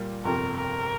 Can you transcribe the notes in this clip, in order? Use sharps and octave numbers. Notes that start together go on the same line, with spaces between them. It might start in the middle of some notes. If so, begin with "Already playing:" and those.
Already playing: A#2 G3 A#3 F4
G1 F2 C3 A#3 A#4
A#4